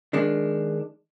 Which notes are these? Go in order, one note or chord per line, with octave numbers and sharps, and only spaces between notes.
D#3 G#3 D4